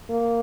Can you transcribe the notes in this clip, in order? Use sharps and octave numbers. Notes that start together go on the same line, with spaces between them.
A#3